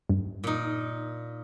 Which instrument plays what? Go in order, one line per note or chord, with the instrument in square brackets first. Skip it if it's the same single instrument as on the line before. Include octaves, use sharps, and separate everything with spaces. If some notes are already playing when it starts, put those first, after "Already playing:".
[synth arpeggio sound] G2
[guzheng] A#2 D#4